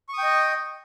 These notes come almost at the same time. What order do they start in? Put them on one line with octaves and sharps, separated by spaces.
C#6 D#6 G5 D#5